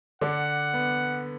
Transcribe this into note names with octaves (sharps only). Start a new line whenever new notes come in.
D3 D4 F#5
B3